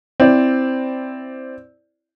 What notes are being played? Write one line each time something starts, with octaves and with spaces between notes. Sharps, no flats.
C4 E4 C5 D5